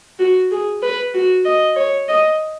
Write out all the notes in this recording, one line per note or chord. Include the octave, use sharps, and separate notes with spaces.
F#4
G#4
B4
F#4
D#5
C#5
D#5